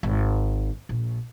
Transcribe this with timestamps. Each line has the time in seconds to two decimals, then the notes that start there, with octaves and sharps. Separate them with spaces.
0.03 G#1
0.89 A#1